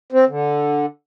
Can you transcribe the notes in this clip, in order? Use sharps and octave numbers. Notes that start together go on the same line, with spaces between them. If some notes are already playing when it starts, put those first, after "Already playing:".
C4
D3